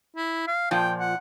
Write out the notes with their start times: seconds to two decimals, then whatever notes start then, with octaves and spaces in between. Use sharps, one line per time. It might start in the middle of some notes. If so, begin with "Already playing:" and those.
0.16 E4
0.47 F5
0.71 A#2 F3 G5
1.00 F#5